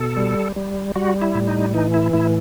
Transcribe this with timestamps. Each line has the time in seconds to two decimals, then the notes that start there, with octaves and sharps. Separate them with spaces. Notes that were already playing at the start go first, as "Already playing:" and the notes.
Already playing: B2 A4
0.17 G3
0.56 G3
0.95 G3 F#4
1.22 E4
1.35 A2
1.48 D#4
1.74 E3 D#4
1.94 E4
2.13 A2 E4